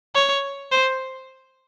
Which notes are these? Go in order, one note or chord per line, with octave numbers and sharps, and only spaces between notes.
C#5
C5